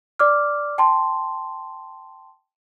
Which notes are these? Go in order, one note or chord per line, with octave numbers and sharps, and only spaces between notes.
D5 D6 F6
G5 A5 C6